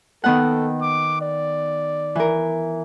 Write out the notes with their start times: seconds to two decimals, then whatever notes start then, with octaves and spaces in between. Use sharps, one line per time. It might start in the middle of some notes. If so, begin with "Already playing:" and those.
0.24 D#3 B3 A4 F#5
0.82 D6
1.21 D5
2.15 E3 A#4